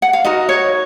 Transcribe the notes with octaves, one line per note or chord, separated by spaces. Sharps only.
F#5
F5
D#4 F#4 A#4 D#5
C#5